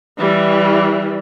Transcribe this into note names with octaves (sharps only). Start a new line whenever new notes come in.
E3 G3